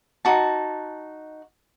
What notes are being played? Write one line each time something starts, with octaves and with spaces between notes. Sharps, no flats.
D#4 F#4 A5